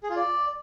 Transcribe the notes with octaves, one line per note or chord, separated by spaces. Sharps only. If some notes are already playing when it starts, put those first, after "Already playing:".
G#4
F4
D5